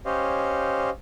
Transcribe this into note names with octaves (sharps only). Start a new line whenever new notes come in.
C#4 G4 C5 C#5 D#5 F5